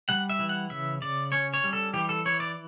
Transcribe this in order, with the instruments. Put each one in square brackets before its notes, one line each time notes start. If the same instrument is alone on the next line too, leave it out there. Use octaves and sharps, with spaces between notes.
[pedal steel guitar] G3 F#5
E5
E3
F#5
C#3 E5
C#3 D5
C#4 C#5
C#5
G3
A4
E3 G4
A4
E3 C#5
D5